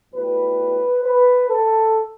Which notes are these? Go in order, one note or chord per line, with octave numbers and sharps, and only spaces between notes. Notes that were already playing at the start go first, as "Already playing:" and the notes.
B1 A2 G3 B4
B4
A4